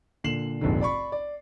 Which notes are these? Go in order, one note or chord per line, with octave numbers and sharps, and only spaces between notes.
A#2 D3 C7 E7 F#7
F1 A#1 G#2 D3
D5 B5 C#6
D5